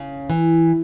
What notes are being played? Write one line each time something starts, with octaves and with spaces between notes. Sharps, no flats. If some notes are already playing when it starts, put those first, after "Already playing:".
Already playing: C#3
E3